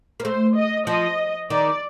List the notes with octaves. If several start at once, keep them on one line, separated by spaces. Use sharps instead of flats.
A#3
A3 C5
D#5
F3 D#5
D#3 D5